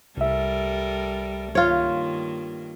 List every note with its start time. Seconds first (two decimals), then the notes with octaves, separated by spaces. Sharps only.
0.17 C2 G3 A4 A#4 E5
1.55 G2 D#3 A#3 F4 C#5